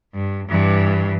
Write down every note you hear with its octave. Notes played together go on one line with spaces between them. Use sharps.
G2
G2 E3